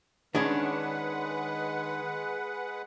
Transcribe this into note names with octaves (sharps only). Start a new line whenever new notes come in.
D#3 G#3 C#4 D4 G#4 B4 F#5